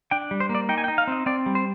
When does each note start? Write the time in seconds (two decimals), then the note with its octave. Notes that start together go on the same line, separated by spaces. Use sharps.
0.11 D4 G5
0.31 G3
0.40 C5
0.49 A#3
0.55 D5
0.69 D#4 G5
0.78 G#5
0.84 G5
0.88 D#4
0.98 F5
1.07 C4 D#5
1.26 C4 D5
1.46 G3
1.55 C5